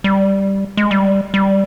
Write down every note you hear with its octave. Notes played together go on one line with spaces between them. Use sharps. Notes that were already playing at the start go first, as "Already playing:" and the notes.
G3
G#3
G3
G3